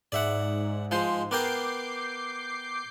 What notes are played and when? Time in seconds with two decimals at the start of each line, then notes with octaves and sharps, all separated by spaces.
0.12 G#2 D5 E5 F#5
0.91 F3 G#3 C5
1.31 B3 A#4 G5 D6 G6 C7